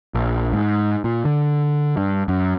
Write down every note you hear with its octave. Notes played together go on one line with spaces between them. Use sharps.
A#1
G#2
A#2
D3
G2
F#2